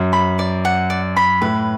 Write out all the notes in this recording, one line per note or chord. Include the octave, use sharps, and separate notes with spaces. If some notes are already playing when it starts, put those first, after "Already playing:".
Already playing: F#2
B5
D5
F#5
D5
B5
A2 B4